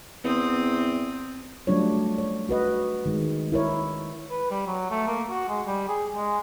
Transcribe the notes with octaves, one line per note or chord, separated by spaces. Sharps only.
E2 C4 D#6
F#3 G3 A3 D4 F4 C#5
C#5
F#4 B4 D#5
D#3 G#3
E4 A#4 C#5
B4
G3
F#3
A3
A#3
F#4
G#3
G3
G#4
G#3